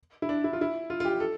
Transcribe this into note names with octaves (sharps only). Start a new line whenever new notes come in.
E4
D4
E4
F4
E4
F4
F4
G4
A4